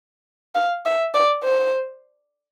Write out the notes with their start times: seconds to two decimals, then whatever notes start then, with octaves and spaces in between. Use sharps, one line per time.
0.55 F5
0.86 E5
1.14 D5
1.44 C5